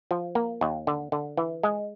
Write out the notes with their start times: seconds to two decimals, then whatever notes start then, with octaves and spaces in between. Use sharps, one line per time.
0.11 F3
0.35 A#3
0.61 D#2
0.87 D3
1.12 D3
1.37 E3
1.63 G#3